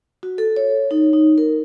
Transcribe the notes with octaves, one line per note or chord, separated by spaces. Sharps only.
F#4
A4
C#5
D#4
D#4
A#4